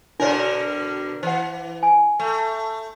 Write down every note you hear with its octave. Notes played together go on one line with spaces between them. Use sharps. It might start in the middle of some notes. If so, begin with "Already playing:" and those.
B2 D3 D4 A#4 C#5 D5
E3 C5 F#5
G#5
A3